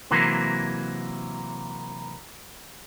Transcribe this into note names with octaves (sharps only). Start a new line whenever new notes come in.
C3 E3 F#3 A#3